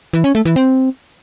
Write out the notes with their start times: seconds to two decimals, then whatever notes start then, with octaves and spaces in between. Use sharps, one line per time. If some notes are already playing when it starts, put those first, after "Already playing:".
0.13 E3
0.24 C#4
0.35 A3
0.45 E3
0.56 C4